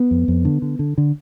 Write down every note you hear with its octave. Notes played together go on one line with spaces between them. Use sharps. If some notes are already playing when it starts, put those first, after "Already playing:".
Already playing: B3
F2
F2
D3
D3
D3
D3